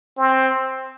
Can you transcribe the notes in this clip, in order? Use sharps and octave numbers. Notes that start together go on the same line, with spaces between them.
C4